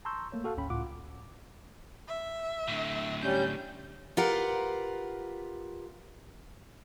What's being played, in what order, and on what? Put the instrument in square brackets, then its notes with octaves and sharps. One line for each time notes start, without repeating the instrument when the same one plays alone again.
[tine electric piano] A5 A#5 C6 C#6 E6 G6
A3 A#3 C#5
F#4 A4 F5 F#5 A5
G#1 D2 G#2 C#4 G5 B5
C#2 A2 F4 F#5 D6
[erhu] E5
[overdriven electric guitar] A2 D3
[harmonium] G3 C#4 [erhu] G6
[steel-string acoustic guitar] F4 G4 A#4 B4 F#5